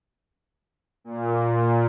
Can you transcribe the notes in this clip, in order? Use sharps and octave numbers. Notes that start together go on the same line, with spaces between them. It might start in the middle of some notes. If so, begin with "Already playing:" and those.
A#2